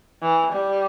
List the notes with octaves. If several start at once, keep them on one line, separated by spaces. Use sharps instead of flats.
E3
G3